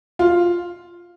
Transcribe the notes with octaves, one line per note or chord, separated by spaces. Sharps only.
F4